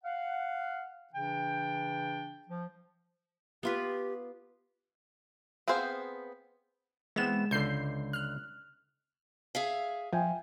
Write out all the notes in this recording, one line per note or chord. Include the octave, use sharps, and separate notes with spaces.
F5 F#5
C#3 E3 D4 G5
F3
B3 F4 G4 B4
B3 C4 G#4 C5 F5
E3 G#3 B3 C4 E7
C#2 D3 G6 C7
F6 F#6
G#4 E5 F5
F3 E5 G5 G#5